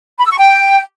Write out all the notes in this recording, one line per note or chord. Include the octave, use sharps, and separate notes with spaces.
B5
E6
C#6
G5